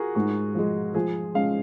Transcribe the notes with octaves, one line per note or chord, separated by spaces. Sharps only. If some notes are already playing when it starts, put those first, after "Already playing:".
Already playing: F4 F#4 G#4 A#4
G#2 F#4
F3 G#3
F3 G#4
G#3 C#4 F5